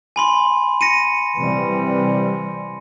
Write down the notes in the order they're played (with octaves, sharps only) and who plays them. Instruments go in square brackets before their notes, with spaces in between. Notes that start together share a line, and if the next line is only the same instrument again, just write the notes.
[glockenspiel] G#5 B5 C6
A#6 C#7 D#7
[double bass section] C3 E3 G3